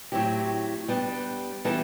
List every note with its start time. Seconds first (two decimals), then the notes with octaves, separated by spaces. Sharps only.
0.12 A2 F#3 C4 E4 G4
0.88 G3 B3 D4 G4
1.64 E3 G3 B3 F#4 A4